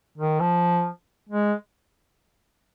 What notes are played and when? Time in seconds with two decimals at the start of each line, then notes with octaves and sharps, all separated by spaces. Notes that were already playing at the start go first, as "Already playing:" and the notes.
0.18 D#3
0.40 F3
1.29 G#3